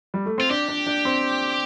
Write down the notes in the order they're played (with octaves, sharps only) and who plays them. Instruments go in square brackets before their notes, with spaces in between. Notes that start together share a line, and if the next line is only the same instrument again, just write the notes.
[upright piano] G3
A3
[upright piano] C4 [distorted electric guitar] F4
[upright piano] D4 [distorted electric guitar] G4
[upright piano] D4
D4
C4